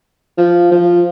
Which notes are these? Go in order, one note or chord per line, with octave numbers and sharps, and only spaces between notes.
F3
F3